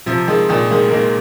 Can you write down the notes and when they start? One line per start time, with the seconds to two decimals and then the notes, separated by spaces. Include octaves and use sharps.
0.06 C3 F3
0.28 D#3 G#3
0.49 A#2 D#3
0.71 D#3 G#3
0.88 A#3
0.92 D#3 G#3